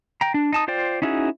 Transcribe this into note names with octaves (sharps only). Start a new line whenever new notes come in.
G5 A#5
D4
D#4 A5 D#6
F4 C5 D5 G5
C#4 D#4 E4 F#4 G#4